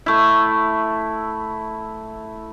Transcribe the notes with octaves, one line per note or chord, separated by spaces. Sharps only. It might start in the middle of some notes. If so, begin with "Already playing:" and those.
A3 E4